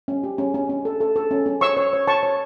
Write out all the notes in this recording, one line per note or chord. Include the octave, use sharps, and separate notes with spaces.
C#4
G4
C#4
C#4
C#4
A4
A4
A4
C#4
C#4
C#5 C#6 E6
C#5
C#5
C#5 A5 C#6
C#5